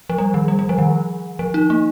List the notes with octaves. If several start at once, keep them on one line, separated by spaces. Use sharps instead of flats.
F3
G3
D#3
G3
G3
F3
D#3
F3
D#4
A#3